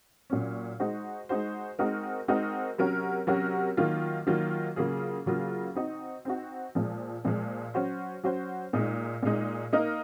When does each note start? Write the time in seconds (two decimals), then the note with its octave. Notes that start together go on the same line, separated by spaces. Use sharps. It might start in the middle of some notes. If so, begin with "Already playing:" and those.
0.30 A#2 F#3 C#4
0.80 G#3 D#4 F#4 C5
1.29 G#3 D#4 F#4 C5
1.79 G#3 C4 D#4 F#4 A#4
2.28 G#3 C4 D#4 F#4 A#4
2.78 C3 F#3 C#4 F#4 A#4
3.27 C3 F#3 C#4 F#4 A#4
3.77 D#3 F#3 A#3 F4
4.27 D#3 F#3 A#3 F4
4.76 C#3 F#3 A#3 F4 G#4
5.26 C#3 F#3 A#3 F4 G#4
5.75 C4 D#4 F#4
6.25 C4 D#4 F#4
6.75 A#2 F3 G#3
7.25 A#2 F3 G#3
7.74 F#3 C#4 F#4 C5
8.23 F#3 C#4 F#4 C5
8.73 A#2 G#3 D#4
9.23 A#2 G#3 D#4
9.73 A#3 D#4 A#4 D#5